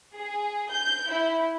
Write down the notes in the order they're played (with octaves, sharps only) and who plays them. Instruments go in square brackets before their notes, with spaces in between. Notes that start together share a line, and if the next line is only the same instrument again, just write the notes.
[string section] G#4
G6
E4